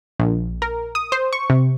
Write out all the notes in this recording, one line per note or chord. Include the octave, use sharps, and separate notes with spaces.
A#1
A#4
D#6
C5
C#6
C3